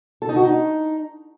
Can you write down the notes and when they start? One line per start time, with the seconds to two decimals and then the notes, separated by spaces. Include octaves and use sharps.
0.22 A4
0.29 D#4
0.36 F#4
0.43 D#4